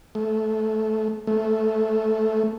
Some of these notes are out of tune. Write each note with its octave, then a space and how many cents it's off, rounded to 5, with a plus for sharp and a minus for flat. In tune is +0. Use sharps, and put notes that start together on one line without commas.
A3 -15
A3 -5